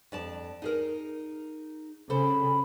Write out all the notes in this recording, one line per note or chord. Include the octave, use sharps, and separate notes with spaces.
F2 D5 A5
D#4 G#4 A#4
C#3 A4 C5 B5